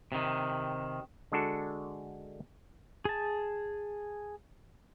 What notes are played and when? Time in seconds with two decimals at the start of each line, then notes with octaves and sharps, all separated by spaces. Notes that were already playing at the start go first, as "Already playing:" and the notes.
0.12 C3 D#3
1.32 D3 G#3 D4 F#4 A4
3.05 G#4 A5